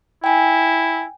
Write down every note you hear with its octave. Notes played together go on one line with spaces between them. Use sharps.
E4 G5 G#5